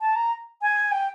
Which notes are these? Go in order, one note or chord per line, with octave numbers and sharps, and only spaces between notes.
A5
A#5
G#5
G5